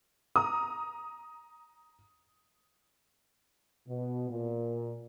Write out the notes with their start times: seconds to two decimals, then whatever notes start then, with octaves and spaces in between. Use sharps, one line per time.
0.36 A#5 D#6
3.88 B2
4.29 A#2